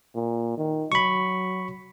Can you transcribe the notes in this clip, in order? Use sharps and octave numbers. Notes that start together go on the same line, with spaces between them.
A#2
D#3
F#3 B5 C#6